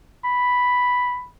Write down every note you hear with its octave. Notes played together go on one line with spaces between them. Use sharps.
B5